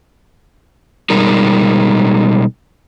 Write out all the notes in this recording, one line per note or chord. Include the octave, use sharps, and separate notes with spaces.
B2 G3 G#3 D#4 A#4